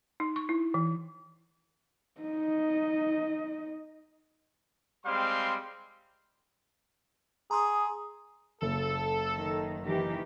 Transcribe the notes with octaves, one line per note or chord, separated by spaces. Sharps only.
D#4
C#6
E4
E3
D#4 D#5
G3 G#3 C4 F5 C6
G#4 A#5 C6 D#6
F#1 A4
D#3
D#3 E3 G4